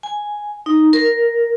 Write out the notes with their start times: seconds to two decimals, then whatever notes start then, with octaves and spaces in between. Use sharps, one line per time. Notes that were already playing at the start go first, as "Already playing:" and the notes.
0.03 G#5
0.66 D#4
0.93 A#4